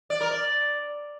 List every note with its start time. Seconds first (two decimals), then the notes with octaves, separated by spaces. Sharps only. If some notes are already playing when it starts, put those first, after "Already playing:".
0.10 D5
0.21 A#4
0.31 D5